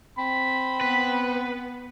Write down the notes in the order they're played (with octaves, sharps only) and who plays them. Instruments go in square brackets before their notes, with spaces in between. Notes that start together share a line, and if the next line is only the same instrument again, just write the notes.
[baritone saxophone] C4 [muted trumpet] B5
[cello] B3 [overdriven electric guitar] B4